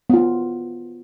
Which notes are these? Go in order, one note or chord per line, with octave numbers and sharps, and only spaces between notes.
B3 F4